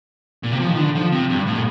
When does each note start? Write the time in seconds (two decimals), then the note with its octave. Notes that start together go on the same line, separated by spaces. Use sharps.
0.43 A#2
0.52 C3
0.60 F3
0.69 D#3
0.77 D3
0.95 F3
1.12 C3
1.30 G2
1.47 A2
1.56 A#2